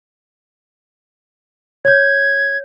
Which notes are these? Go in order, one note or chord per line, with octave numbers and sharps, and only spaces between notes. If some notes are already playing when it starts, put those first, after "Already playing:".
C#5 G6 G#6